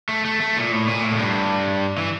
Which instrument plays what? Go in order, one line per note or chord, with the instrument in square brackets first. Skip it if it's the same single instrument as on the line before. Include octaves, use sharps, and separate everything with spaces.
[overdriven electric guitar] A3
A3
A3
A#2
A2
A#2
A2
F2
G2
E3